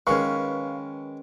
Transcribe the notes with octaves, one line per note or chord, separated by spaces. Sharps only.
D#3 G#3 C#4 B4 F5 C#6